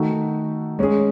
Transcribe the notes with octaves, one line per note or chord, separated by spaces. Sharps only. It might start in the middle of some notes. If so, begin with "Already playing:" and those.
Already playing: D#3 A3 D#4 F#4
G#3 C#4 G#4